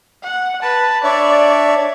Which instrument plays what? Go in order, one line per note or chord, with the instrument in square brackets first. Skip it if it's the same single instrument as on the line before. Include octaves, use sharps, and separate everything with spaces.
[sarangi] F#5
[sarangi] B4 [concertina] A5
[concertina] D4 C#5 E5 [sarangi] D5